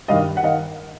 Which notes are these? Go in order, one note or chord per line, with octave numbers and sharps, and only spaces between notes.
G2 D#3 D#5 F5
F#5
D#3 D#5 F5